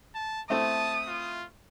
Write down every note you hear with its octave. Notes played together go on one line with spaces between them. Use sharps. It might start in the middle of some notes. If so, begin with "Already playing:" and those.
A5
A3 C4 E4 A5 D#6
F4